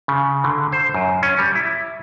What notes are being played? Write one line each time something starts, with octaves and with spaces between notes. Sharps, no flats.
C#3
D3
C5
F#2
C#4
G3
E4